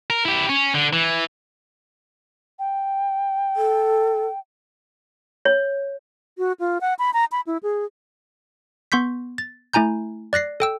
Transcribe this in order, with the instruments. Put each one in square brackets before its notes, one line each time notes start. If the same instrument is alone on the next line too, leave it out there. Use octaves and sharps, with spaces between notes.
[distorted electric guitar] A#4
E4 G4
C#4
D3
E3
[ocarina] G5
[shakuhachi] A4
[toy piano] C#5
[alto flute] F#4
F4
F#5
B5
A#5
B5
E4
G#4
[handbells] B3 C6 C#6 G6 B6
A6
A3 E4 G#5 A#5 G6
D5 F#6 A#6 C7
A4 G5 E6